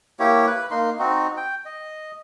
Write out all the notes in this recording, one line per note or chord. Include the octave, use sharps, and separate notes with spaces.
A#3 E4 G4 C#5
B4
A#3 D#4 C6
C4 D#4 F#4
G5
D#5